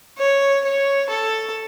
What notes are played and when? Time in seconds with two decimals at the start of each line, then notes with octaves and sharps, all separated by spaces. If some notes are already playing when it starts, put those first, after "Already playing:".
0.18 C#5
0.65 C#5
1.10 A4